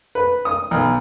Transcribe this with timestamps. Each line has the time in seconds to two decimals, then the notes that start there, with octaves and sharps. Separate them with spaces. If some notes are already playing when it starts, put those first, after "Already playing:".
0.15 B4
0.45 D#6
0.71 B1